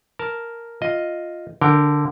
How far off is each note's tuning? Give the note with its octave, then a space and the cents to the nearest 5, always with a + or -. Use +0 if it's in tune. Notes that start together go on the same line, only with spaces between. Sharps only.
A#4 +0 A5 +0
F4 +0 D#5 +0
D3 +0 A#4 -15 G5 +0